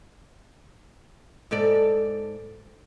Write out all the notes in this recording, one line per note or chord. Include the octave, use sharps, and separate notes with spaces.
G#2 A4 D5